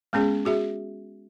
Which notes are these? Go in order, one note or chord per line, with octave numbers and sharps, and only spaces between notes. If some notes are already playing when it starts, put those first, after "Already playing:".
G#3 B3 C#4 G#4
F#4 G#4 E5